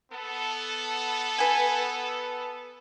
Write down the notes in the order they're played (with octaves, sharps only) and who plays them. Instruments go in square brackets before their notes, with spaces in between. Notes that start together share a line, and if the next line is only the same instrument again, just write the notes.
[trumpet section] B3 A4
[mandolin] B4 G#5